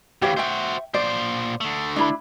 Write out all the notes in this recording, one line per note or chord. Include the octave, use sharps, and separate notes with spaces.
D2 E3 G4 C#5 F5
F#4 C5 E5 G5
A#2 C5 D5
D3 A3
D4 E4 B5